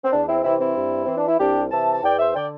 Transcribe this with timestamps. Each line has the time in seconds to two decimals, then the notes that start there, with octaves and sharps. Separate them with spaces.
0.05 C4
0.13 E2 D4
0.29 C4 E4
0.44 C3 E3 C4 E4
0.60 C4 E4
0.76 G2
1.06 E3 C4
1.17 D4
1.28 E4
1.40 C2 D4 G4
1.72 C3 E3 E5 A5
1.94 A5
2.03 E2 D5 G5
2.19 C5 E5
2.35 D3 D5 G5